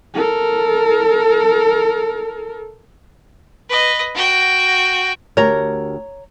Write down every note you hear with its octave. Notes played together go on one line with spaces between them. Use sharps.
A4 A#4
B4 D#5
F#4 G5
D2 G4 A#4 C#5 A#5